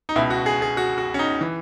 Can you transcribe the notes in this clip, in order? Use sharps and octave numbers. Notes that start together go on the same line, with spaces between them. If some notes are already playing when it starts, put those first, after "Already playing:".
D#4
C#2 B2 E4
F#4
G#4
G#4
F#4
F#4
C#4
D#4
E3